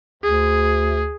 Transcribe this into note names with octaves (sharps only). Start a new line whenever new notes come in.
D2 G#4